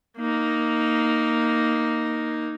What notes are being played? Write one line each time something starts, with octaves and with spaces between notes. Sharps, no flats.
A#3 D#4